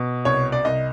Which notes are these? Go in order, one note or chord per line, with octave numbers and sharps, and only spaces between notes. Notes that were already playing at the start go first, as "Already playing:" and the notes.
Already playing: B2
C2 C#5
D5
C2 D#5